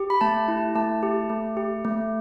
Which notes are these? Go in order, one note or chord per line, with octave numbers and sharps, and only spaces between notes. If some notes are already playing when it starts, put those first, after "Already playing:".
Already playing: G4
B5
A3 A5
E4
A3 A5
G4
A3
G4
A3